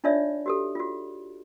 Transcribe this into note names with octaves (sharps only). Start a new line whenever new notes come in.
D4 D#4 F4 C#5 D5 E5
F#4 G4 A4
F4 F#4